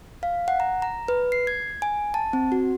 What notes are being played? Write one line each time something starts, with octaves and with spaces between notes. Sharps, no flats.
F5
F#5
A#5
A#5
B4
C7
G#6
G#5
A5
C4
F#4